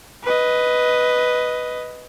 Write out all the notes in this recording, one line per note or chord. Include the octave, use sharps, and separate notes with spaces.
B4 D#5